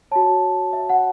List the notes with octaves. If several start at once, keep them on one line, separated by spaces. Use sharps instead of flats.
F#4 C#5 A5
E5
F#5